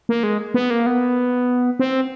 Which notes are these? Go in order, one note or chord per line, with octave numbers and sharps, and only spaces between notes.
A#3
G#3
B3
A#3
B3
C4